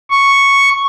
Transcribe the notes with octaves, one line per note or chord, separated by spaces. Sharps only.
C#6